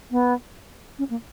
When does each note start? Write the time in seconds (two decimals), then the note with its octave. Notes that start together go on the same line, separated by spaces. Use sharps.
0.11 B3
0.98 C#4
1.10 A#3